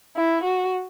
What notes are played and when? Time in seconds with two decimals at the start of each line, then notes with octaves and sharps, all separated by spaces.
0.16 E4
0.44 F#4